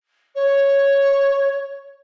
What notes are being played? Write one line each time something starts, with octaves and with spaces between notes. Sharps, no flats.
C#5